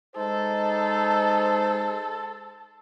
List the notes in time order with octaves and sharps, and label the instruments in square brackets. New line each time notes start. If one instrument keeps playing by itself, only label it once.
[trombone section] G#3 D#4 C5 [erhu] A4